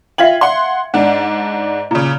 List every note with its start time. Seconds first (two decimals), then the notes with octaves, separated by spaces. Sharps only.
0.18 F4 E5 F5 G5 G#6 F#7
0.41 F#5 C6
0.94 G#2 D4 F#5
1.91 A#2 C#3 E4